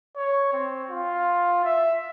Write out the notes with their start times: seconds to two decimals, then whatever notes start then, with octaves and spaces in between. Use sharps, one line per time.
0.16 C#5
0.53 C4
0.90 F4
1.65 E5